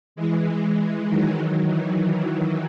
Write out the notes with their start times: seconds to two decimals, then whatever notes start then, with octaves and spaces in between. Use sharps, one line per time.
0.16 E3 G#3
0.76 E3
1.06 D#3 F#3
1.36 D#3 F#3
1.66 E3
1.97 E3
2.27 D#3 F#3